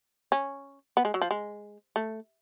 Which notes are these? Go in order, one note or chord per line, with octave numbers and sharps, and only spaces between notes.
C#4
B3
G#3
F#3
F3
G#3
A3